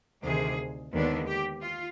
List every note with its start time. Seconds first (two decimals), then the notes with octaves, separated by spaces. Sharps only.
0.24 D2 C3 D#3 G#4
0.92 D#2 D3 G#3 B3 D4
1.27 G4
1.61 F4